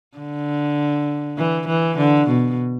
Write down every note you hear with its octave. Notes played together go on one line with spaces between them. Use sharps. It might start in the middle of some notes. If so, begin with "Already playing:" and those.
D3
E3
E3
D3
B2